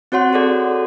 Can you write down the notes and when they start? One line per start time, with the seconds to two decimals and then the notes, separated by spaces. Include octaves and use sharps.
0.12 C4 F#4 C#5 F#5 C6
0.33 F#4 G#4 A4 D5